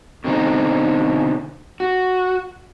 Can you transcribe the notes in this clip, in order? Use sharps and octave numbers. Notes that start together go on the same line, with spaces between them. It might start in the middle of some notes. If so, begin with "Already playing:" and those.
B2 D3 C4 D#4
F#4